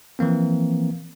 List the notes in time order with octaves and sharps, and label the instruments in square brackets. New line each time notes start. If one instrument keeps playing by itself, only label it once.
[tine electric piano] E3 F3 A#3 C4